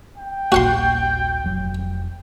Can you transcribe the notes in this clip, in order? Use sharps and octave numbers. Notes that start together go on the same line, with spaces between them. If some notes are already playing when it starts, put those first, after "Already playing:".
G5
D#1 A#1 A#3 F#4 F#5 C6
F1 F#3